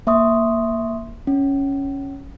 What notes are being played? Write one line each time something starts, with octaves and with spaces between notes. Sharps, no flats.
A#3 E5 C6 C#6 D#6
C#4